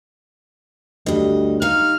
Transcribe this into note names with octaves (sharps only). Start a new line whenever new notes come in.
D2 G2 D#5
D#4 F5 F6